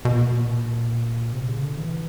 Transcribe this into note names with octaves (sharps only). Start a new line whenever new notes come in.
B2
A#2
C3
C#3
D3
E3